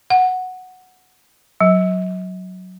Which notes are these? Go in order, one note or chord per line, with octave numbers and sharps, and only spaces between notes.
F#5
F#3